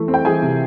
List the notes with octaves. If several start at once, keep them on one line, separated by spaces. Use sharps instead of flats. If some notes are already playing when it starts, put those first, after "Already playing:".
Already playing: E3 A3 A5
C4
G5
E3 G#4 G#5
C3